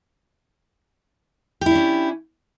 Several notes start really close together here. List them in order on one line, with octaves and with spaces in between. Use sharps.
G4 E4 D4 C#4